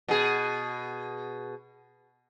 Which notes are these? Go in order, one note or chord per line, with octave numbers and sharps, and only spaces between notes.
B2 G#4